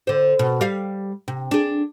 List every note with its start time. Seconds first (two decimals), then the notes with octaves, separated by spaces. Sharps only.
0.07 D3 C5
0.39 B2
0.61 G3 F5
1.28 C3
1.51 D4 G#4